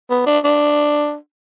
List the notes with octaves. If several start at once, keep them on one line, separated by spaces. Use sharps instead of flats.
B3
D4
D4